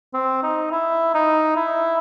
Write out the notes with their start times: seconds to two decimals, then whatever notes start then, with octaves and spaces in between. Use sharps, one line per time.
0.13 C4
0.43 D#4
0.71 E4
1.14 D#4
1.56 E4